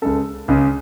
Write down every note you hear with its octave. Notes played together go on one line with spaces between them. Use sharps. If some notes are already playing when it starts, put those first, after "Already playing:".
C#2 C#3 G#3 C#4 A4
C#2 C#3 G#3 C#4